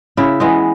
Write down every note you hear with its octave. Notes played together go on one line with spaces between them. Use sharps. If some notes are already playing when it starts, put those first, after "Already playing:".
C#3 E4
E3 G#3 B3